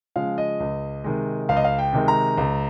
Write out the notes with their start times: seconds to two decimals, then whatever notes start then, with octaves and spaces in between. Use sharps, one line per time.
0.16 C#3 F3 G#3 F5
0.38 D#5
0.60 C#2
1.04 C3 D#3 G#3
1.49 C#2 F5
1.57 D#5
1.64 F5
1.78 G5
1.93 C3 D#3 G#3
2.08 A#5
2.38 C#2